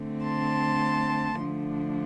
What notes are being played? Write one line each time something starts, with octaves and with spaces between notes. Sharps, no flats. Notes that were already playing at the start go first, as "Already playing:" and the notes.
Already playing: D3 A3 C4
A5 C6
D3 F3 A3 D4